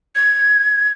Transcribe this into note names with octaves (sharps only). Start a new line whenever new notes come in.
G#6